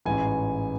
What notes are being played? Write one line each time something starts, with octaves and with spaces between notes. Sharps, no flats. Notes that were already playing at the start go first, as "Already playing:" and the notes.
A1 G#2 E3 G#5